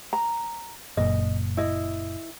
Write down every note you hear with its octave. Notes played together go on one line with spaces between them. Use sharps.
A#5
F#1 A#2 D#5
E4 D#5